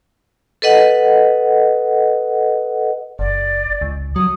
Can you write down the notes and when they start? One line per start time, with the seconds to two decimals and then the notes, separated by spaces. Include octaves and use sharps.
0.62 A4 B4 D#5 F#5
3.19 F#1 D5
3.82 C#2
4.16 F#3 D#6